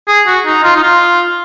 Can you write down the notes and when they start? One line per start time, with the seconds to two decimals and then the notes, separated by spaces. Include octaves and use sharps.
0.08 G#4
0.27 F#4
0.46 D#4
0.64 F4
0.76 D#4
0.83 F4